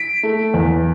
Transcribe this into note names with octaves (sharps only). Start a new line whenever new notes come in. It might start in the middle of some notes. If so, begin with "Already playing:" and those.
Already playing: B6 D7
A3
E2